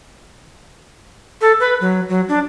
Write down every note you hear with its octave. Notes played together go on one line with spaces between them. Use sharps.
A4
B4
F#3
F#3
D4